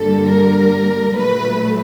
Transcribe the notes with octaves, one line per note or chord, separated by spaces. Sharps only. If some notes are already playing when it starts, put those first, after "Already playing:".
Already playing: G2 D3 G3 A#3 A4
A#4
A#2 F#3 A3 B4